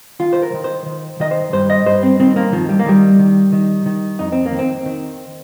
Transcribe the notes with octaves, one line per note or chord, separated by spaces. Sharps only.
D#3 F4
C5
A#4
D#3
C5
D#3
D#3 D#5
C5
G2 C5
D#5
G2 C5
C4
D#3 C4
A#3
D#3 F3
G3
A#3
D#3 G3
D#3
D#3
D#3
F2 D#4
C4
A#3
D#3
C4
D#3